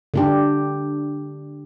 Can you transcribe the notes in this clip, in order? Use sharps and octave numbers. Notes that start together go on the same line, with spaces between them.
D3 D4 G4